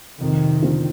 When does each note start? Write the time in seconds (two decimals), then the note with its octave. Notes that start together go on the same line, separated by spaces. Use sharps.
0.21 F2 C3 D#3
0.61 D3 F3 C4 F4